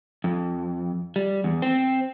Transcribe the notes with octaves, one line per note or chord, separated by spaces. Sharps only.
F2
G3
E2
C4